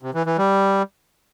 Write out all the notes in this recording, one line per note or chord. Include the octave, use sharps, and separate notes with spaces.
C3
E3
E3
G3